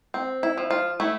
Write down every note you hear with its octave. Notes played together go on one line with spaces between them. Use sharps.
C4
E4
F3
F4
A3 E4